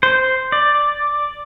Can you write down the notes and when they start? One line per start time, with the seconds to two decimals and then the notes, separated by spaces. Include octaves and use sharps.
0.03 C5
0.52 D5